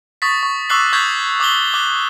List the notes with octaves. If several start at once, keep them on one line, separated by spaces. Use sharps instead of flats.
C#6 D#6 A6 B6
C#6
C#6 D6 E6 F#6 C7 F#7
C#6 D#6 E6 G6 G#6 B6
D6 D#6 F#7 G7
D6 F#6